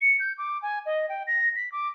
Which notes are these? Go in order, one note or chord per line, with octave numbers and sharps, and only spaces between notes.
C#7
G6
D6
G#5
D#5
G5
A#6
B6
D6